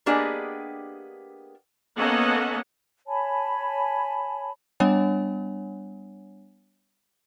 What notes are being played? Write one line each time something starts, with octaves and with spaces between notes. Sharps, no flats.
A#3 B3 D4 G4 G#4 D#5
A#3 B3 C#4 A4 D#5 F#5
C#5 G#5 A5 B5
G3 B3 D4 C#5 F#5 G#5